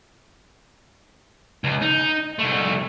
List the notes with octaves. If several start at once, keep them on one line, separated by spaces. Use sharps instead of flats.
C#2
D#4
C2 A3